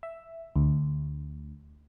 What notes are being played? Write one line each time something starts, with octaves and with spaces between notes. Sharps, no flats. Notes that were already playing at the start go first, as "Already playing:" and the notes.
E5
D2